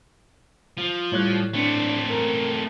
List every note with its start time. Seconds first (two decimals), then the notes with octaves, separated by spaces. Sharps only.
0.78 F3
1.12 A2 G3 C#5 F#6
1.54 A3 C4 D4
2.09 A#4